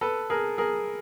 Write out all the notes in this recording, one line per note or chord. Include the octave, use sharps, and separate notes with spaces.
A4 B4
G#4 A#4
G#4 A#4